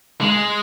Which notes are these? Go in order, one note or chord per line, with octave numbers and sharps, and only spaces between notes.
G#3